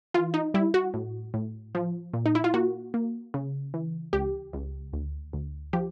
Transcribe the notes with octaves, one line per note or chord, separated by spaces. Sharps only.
E3 F4
D#4
G3 E4
F#4
A2
A2
F3
A#2
D#4
E4
F4
A#3 F#4
A#3
C#3
E3
C#2 G4
C#2
D2
D2
F3 G4